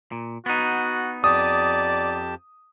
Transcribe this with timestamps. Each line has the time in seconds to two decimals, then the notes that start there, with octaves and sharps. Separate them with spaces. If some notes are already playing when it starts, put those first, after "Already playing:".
0.12 A#2
0.46 B3 D#4 F#4
1.24 F2 G4 D5 A5 D#6